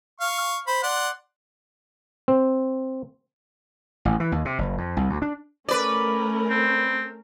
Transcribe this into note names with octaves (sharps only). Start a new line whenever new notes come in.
F5 C#6
C5 B5
D5 F#5 C6
C4
A1
E3
D#2
C3
F#1
F2
C2
D2
D4
A3 C#4 A#4 B4 D5
C4